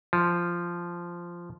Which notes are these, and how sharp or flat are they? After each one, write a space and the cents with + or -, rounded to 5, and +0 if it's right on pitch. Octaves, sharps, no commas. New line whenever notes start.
F3 -10